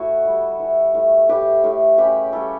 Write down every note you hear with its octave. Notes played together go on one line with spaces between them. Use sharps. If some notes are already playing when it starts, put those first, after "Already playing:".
Already playing: A2 E4 F#4 A4
G3
E3
A2
A2 G4 B4
A2
C#3 G4 B4
G3 A4 C#5